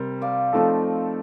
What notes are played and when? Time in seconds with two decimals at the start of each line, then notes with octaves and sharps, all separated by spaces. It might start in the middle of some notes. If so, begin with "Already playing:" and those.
Already playing: C3 G3 A#4 C5
0.21 D5 F5
0.53 F3 A3 C4 D#4 A4